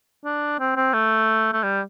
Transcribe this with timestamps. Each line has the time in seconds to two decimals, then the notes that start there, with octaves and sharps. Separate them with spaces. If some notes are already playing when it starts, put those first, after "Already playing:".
0.25 D4
0.59 C4
0.76 C4
0.93 A3
1.53 A3
1.63 G3